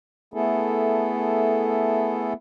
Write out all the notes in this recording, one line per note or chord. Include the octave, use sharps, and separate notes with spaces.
A3 B3 E4 G#4 A4